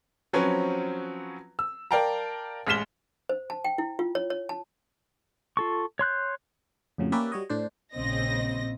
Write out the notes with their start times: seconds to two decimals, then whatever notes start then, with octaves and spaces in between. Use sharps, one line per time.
0.33 F3 F#3 C4 C#4 B4
1.59 E6
1.91 A#4 D5 F5 G5 A5 A#5
2.67 A1 G#3 F6 B6 E7 G7
3.29 C5
3.50 A5
3.64 G5
3.78 E4
3.99 F4
4.15 C#5
4.30 C#5
4.49 A5
5.57 F4 A4 C#6
5.99 C#5 C6 F#6 G6
6.98 F2 A2 C#3 F#3
7.12 A#3 C#4 G4 B4 D5 E5
7.32 G3 F#4 C#5 D#5
7.50 A2 D4 C5
7.95 A#1 C#3 C4 D#5 A#6